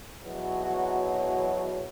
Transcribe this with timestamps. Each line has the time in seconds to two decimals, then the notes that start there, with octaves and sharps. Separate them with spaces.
0.23 E2 B2 F#3
0.63 F#4